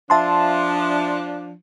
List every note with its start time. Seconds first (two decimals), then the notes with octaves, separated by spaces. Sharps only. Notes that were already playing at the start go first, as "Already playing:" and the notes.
0.10 F3 D4 E5 A5 C6